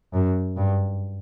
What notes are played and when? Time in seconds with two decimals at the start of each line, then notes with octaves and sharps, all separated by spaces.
0.14 F#2
0.56 G2